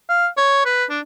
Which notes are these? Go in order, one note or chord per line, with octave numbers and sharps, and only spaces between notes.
F5
C#5
B4
D4